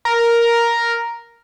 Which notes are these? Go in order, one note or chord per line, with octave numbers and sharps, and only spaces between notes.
A#4